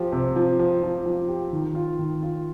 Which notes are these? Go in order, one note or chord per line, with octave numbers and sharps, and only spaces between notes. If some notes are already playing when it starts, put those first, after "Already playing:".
Already playing: F3 G4
C3
F3
F3
F3
F3
G4
D#3
F4
D#3
F4